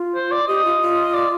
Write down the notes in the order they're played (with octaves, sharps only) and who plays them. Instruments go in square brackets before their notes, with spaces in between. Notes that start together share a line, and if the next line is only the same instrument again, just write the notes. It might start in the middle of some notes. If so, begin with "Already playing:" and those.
Already playing: [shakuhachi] F4
[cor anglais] C5
D5
[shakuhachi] G4 [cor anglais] D#5
[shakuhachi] F4
F4
[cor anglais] D5